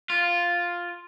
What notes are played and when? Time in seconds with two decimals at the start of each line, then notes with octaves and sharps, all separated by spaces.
0.10 F4